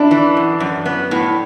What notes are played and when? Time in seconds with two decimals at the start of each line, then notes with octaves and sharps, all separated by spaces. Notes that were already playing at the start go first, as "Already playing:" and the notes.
Already playing: D4 E4
0.11 E3
0.37 F#2
0.60 F#2
0.86 B3
1.11 A2